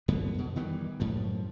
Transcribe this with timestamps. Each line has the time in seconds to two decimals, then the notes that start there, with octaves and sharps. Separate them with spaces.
0.08 F#2 D3 B3
0.34 F2 B2
0.56 D#3 E3 G3 B3
1.00 F#2 A2 F3